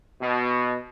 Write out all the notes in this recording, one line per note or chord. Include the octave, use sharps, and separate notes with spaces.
B2